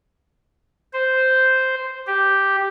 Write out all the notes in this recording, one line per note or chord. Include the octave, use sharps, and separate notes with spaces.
C5
G4